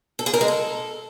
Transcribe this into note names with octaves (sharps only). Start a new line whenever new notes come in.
A4
G#4
A#4
G#3
A4